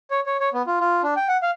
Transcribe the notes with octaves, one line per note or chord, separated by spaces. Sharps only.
C#5
C#5
C#5
B3
F4
F4
D4
G5
F#5
F5